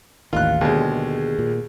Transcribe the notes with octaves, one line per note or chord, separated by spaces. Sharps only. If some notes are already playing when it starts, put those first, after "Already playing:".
A1 D#2 D#3 F4 F#6
D#2 B2 D3 G#3
A#2